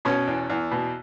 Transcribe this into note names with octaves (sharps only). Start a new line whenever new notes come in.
B2 C#4
E2
E2
B2